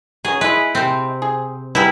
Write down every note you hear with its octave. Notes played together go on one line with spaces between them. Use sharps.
F#3 C#4 G#4
G#3 E4 B4 D#5
C3 C4
G#4
G3 B3 D#4 E4 G#4